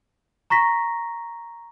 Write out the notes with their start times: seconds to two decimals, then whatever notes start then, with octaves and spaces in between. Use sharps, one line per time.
0.50 A#5 C#6 A#6 B6